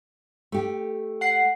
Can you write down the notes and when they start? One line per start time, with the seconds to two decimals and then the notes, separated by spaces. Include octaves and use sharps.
0.52 A3 G4
1.21 F#5 C7